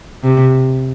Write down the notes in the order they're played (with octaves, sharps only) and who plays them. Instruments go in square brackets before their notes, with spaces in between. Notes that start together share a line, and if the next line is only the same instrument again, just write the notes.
[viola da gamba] C3